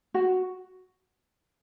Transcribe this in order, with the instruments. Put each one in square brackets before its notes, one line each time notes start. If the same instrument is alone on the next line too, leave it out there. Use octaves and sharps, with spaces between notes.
[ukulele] F#4